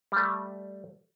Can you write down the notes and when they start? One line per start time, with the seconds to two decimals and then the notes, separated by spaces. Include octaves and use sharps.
0.12 G3 A3